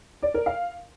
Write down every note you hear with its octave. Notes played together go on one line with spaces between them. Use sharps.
D5
A#4
F5